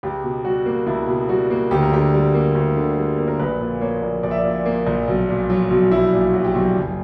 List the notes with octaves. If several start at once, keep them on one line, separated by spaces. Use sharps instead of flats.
C#2 G4
B2
G3 F#4
A#3
C#2 E4
B2
G3 F#4
A#3
D2 G4
A#4
D3 G4
G3
A#3
D2
D3
G3
A#3
A#4
A#1 B4
A#2
A#3 C#5
A#1
A#1 D5
E5
D5
A#2
A#3
A#1
B1
A#2
F#3
B1
B1 E4
A#2
F#3 F#4
G4
B1 F#4
F#1